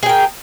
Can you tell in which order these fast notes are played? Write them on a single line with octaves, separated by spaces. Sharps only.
G#4 G5 A#4